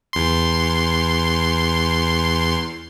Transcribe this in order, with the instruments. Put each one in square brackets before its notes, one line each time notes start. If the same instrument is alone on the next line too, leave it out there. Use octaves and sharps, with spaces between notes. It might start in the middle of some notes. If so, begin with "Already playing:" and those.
[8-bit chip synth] E2 C6